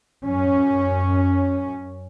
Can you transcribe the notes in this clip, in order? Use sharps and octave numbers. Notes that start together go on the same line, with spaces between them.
F#2 C#4